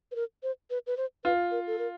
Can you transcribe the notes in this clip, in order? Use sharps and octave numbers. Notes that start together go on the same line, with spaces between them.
B4
A#4
C5
B4
B4
C5
F4 B4
A#4
A4
A#4